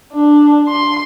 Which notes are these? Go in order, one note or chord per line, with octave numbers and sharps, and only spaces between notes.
D4
C6